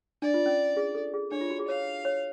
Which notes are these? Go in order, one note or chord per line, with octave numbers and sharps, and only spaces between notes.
D4 D5
F4
C#4
G#4
A4
G#4
D4 C#5
F4
F#4
G#4
C#5 F5
C#5